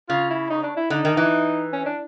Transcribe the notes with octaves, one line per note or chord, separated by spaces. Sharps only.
C#3 F4
E4
D#4
D4
E4
D3 D#4
D#3
E3
C#4
D4